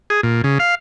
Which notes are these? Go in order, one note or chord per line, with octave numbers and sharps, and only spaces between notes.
G#4
A#2
C#3
F5